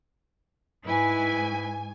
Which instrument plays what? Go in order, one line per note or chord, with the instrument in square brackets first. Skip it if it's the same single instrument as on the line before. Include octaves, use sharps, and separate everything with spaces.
[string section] G#2 G#5 [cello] E4 B4